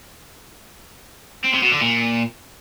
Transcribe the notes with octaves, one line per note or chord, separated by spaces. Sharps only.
C4
C3
B2
D3
A#2